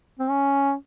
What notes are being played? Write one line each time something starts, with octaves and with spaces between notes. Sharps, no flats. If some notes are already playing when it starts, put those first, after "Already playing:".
C4
C#4